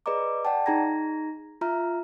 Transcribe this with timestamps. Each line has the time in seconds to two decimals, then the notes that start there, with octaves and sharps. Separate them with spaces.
0.06 G#4 B4 D5 D#5 A#5 D6
0.45 D5 F#5 G5 A5
0.66 D#4 G#4 A#5 G#6 A#6
1.61 F4 E5 A#5 F6